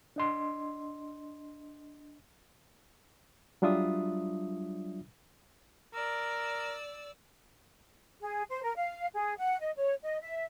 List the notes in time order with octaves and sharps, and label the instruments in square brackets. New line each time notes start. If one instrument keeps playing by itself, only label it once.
[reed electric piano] D4 D#5 C6
F#3 G3 D4 F4 E5 D#6
[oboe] A#4 [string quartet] D5 E6
[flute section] G#4
C5
A#4
F5
G#4
F#5
D#5
C#5
D#5
E5